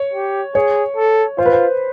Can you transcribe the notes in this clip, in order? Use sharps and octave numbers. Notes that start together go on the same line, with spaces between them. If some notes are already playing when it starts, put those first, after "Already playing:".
Already playing: C#5
G4
G#4 C#5
A4
F4 C5
B4
C5